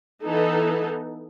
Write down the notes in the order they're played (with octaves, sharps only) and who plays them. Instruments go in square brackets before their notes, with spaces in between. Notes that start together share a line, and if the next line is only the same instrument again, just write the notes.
[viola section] E3 B3 D#4 A4